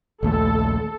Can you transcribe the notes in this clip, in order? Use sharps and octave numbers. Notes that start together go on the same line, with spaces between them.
A#1 D#2 A3 A4